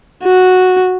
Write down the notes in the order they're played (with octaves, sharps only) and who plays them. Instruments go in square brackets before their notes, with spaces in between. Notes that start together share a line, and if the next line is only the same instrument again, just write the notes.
[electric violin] F#4